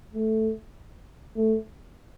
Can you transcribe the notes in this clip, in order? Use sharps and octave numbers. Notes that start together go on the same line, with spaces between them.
A3
A3